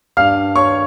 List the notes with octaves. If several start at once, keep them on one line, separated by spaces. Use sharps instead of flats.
G2 G3 F5 F6
C#5 C#6